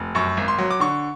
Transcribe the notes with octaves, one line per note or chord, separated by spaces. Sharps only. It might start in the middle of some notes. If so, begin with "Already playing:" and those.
Already playing: F1
F#2 C#6
G#1
C6
F#3
D6
D3 C#6